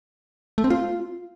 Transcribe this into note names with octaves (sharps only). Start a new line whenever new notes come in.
A3
C4
F4